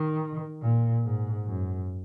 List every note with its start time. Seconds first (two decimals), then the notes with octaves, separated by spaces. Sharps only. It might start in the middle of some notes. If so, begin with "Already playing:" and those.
Already playing: D#3
0.62 A#2
1.03 G#2
1.46 F#2